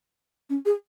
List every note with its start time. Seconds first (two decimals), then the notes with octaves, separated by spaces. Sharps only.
0.50 C#4
0.65 G#4